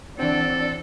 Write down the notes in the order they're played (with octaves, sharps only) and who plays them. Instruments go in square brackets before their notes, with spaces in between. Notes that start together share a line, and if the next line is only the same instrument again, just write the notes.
[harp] E3 F#4 [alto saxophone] C4 [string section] D4 [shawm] A4